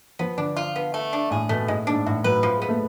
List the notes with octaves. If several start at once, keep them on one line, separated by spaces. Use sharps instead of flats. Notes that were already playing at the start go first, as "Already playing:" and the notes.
F3 B3
D3 D4
F4
B3
A3
D4
A2 G#4
B2 A3
A2 G#3
G#2 D4
A2 F#4
F#3 B4
F3
G#3
B3
A3